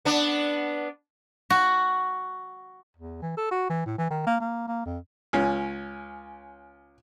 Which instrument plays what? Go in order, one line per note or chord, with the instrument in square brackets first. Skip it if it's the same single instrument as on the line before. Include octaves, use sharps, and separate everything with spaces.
[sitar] B3 D4
[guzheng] F#4
[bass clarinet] E2
E3
A4
F#4
E3
A2
E3
D#3
A#3
A#3
A#3
F2
[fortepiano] C#2 C#4